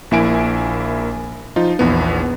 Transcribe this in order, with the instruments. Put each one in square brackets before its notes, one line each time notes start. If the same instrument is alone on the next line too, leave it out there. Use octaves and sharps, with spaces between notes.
[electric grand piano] A#1 A#3 E4 G#5 D7
F3 D#4 F4
A#1 E2 B3